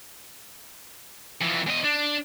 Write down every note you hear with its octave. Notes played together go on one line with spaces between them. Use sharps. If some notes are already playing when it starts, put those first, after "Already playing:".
F2 E3
E2 D#5
D4